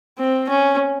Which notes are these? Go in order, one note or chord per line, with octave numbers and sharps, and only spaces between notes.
C4
C#4